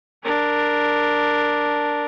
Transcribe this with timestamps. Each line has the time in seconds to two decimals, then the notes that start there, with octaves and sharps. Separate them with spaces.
0.24 D4 A#4